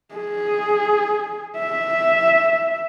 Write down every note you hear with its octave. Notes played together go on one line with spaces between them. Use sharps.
G#4
E5